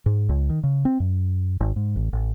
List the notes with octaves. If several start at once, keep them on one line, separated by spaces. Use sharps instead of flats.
G#2
C#2
D#3
C#3
C4
F#2
G#1
G#2
A1
A1